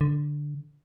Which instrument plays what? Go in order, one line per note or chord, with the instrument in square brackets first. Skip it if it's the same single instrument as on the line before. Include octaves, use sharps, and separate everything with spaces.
[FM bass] D3